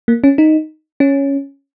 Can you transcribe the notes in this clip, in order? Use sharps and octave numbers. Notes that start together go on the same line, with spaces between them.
A#3
C#4
D#4
C#4